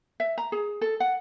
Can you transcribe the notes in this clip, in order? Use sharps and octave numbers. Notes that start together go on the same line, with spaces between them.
E5
A#5
G#4
A4
F#5